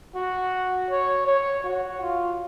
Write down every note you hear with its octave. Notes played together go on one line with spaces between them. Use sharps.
F#4
C#5
C#5
F#4
F4